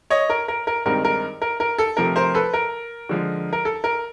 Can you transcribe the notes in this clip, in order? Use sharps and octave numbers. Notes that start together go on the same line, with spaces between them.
C#5 D#5
A#4
A#4
A#4
G2 D#3 G#3 C4 D#4 A#4
A#4
A#4
A#4
A4
C3 F3 A3 A#4
A#4 C5
A4 B4
A#4
D3 F3 G#3
A#4
A4
A#4